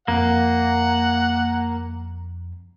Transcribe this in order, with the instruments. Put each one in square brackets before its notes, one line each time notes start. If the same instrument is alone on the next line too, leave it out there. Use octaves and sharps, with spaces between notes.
[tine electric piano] F2 [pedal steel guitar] A#3 [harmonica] F#5